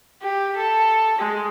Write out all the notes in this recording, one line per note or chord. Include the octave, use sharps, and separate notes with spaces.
G4
A4
G#3